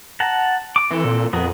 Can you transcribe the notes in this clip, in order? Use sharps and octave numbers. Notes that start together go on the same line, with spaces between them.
F#5 A5 A#5
D6
E3 C4 A4
A#2
F2 B3 G#4 A#4